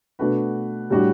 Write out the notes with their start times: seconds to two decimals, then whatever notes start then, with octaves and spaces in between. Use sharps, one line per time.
0.19 B2 A3 D4 F#4 B4
0.90 A2 G3 D4 F#4